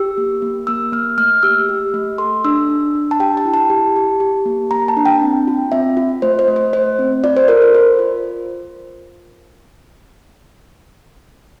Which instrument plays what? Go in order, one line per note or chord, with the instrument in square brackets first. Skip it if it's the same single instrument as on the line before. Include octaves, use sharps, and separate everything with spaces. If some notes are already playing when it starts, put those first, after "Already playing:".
Already playing: [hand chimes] G4 E6
A#3
A#3
A#3 E6
A#3 F6
A3 F6
G4 E6
G4
A3
A4 C6
D4 E6
D4
D4
A5
G4 G5
A5
E4
A5
G4
G4
G4
A#3
A#3 A#5
A5
D4
G5
C4
F4
C4 E5
F4
A3 C5
C5
A3
C5
A3 C5
C4
F4 D5
C5
A4 A#4
C5
F4 C5
F4